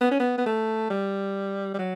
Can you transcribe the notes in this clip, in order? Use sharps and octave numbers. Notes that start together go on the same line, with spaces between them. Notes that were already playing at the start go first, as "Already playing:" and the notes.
B3
C#4
B3
B3
A3
G3
G3
F#3